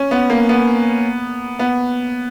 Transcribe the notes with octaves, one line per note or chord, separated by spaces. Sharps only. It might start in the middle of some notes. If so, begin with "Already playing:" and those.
Already playing: C#4
B3
A#3
B3
B3